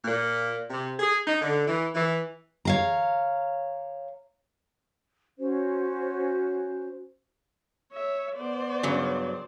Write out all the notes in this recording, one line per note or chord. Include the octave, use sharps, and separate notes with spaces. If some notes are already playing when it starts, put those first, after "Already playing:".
A#2
C3
G#4
D#4
D3
E3
E3
C#5 F5 A#5
C#4 F#4 C5
C#5 E5
B3 C5 D5
G2 C#3 F#3